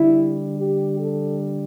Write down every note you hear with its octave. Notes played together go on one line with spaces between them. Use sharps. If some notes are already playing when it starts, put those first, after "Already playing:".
Already playing: D3 G3 E4
G4
A4